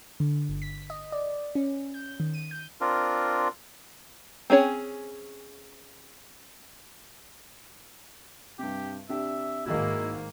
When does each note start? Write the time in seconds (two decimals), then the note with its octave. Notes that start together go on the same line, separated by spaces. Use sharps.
0.20 D3
0.49 G1
0.62 B6
0.90 D#5
1.12 D5
1.55 C#4
1.94 G6
2.20 D#3
2.34 D#7
2.51 G6
2.81 C4 D4 F4 A#4
4.50 C4 C#4 G#4 C#5
8.59 G2 C3 G4
9.09 C3 D4 G4 E5
9.66 G#2 D#3 A#3 E4 F#4 G#4 D#5